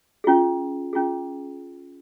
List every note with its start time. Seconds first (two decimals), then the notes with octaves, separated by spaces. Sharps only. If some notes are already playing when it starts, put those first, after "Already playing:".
0.24 C#4 F4 G#4
0.93 C#4 F4 G#4